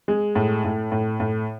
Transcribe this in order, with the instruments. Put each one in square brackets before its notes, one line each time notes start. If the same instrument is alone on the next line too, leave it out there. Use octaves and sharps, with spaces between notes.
[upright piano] G#3
A2
A2
A2
A2